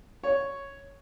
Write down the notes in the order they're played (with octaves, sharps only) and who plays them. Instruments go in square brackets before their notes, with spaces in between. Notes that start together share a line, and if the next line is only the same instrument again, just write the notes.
[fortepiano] C#5